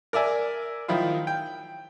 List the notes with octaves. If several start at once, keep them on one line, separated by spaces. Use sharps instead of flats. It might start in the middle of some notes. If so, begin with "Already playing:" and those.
A#4 D5 E5 G#5
D#3 F3 E4 F4
G5